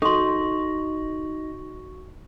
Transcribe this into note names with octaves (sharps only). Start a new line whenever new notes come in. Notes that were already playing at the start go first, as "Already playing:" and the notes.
D#4 F#4 A4 C6 C#6